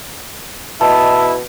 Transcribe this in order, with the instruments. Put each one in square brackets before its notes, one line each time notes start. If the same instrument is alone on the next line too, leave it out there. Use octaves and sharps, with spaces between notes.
[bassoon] B2 [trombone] E4 [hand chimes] D#5 A5